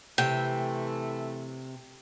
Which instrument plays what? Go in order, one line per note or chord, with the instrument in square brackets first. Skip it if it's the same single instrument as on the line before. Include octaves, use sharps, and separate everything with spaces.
[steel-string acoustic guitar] C3 [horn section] E3 A3 [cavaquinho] G5